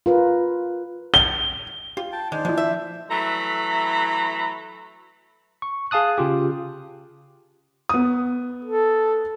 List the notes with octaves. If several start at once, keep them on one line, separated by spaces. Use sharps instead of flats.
F4 A#4 B4
G7
F4 G4
G5 A5
D#3 G#3 D4 C5 D5
F3 G#3 E4
E5
E3 F#3 A3 A#5 B5
C#6
G#4 F5 A5 D#6 F#6
C#3 F4 G4
B3 D#6
A4